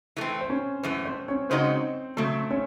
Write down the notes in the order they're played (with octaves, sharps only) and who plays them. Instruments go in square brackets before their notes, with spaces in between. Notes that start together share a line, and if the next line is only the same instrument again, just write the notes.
[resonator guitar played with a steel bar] E3 A3 C4
[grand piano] C5
C#4 C#5
[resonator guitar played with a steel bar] F#2 E3 A3 [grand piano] C4 C5
[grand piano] C4 C5
C#4 C#5
[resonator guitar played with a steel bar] C#3 G#3 D#4 F#4 [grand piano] C4 C5
[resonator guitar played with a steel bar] C#3 F#3 C4 [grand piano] A3 A4
[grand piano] C#4 C#5